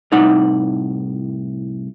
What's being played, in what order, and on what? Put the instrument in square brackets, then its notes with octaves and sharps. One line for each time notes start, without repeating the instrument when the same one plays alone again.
[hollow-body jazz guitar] C2 A2 D#4 F#5